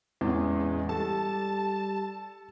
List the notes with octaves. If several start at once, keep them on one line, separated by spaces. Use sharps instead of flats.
E2 A2 G#3 C#4
G3 A4 A5